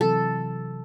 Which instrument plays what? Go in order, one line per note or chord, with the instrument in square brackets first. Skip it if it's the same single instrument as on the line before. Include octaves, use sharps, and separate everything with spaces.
[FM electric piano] C3 E3 F#3 [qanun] A4